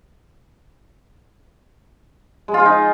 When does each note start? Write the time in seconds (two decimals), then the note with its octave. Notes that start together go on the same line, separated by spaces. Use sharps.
2.48 G#3
2.54 F4
2.60 G#3
2.66 D#4